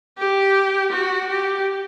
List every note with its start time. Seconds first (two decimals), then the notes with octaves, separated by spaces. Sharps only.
0.18 G4
0.92 F#4
1.28 G4